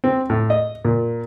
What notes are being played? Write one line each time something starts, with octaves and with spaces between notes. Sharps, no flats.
C4
A2
D#5
A#2